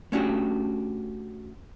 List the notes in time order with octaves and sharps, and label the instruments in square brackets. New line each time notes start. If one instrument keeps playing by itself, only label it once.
[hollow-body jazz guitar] A3 C#4 D4 F#4 G4